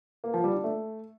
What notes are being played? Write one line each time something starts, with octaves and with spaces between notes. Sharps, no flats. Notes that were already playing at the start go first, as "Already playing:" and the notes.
A#3
F3
G3
D4
A3